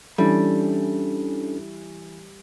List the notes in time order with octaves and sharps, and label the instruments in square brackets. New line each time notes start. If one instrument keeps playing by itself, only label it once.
[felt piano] E3 [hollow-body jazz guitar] G3 [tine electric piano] C#4 D4 A4